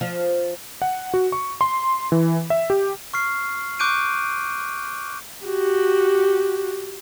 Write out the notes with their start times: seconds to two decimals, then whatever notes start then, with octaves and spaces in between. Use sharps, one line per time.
0.01 F3
0.82 F#5
1.14 F#4
1.32 C#6
1.61 C6
2.12 E3
2.50 E5
2.70 G4
3.14 C#6 F6 C7
3.79 C#6 D6 F#6 G6 D7 D#7
5.45 F#4 G4